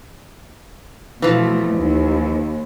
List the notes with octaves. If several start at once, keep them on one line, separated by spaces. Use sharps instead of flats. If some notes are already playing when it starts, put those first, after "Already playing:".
B2 E3 F3 A3
D#2